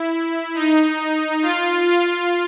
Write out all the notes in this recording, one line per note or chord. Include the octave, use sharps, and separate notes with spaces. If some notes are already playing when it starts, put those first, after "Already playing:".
Already playing: E4
D#4
F4
F4